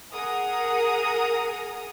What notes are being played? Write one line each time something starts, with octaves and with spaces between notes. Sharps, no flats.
G#4 A#4 F#5 A#5 D#6